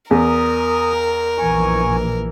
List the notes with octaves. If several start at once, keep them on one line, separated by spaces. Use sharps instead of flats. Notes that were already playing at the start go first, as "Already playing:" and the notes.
E2 A#4 D#6
A#1 E3 G#5 C#6